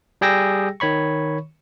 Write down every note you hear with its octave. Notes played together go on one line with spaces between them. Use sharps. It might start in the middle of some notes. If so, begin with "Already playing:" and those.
G3 G4 G#4 G5 E6 A#6
D#3 C#5 B5 C#6